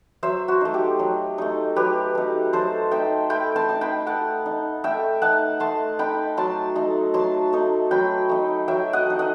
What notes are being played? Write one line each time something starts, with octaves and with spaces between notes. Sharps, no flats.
F#3 C5 E5
F#4
A3 D#4
G4
F#3
A3 D#4
F#3 G4 B4
A3 D#4
F#3 A4 C5
A3 D#4 E5 G5
A3 G5 B5
A5 C6
D#4
G5 B5
A3 F#5 A5
D#4
A3 E5 G5
D#4 F#5 A5
A3 A5 C6
D#4 G5 B5
F#3 A5 C6
A3 D#4
F#3 A5 C6
A3 D#4
F#3 G5 B5
A3 D#4
F#3 E5 G5
D#5 F#5
A3 D#4
D#5 F#5